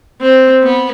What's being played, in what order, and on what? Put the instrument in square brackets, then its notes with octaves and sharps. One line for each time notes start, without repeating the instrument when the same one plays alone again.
[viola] C4
B3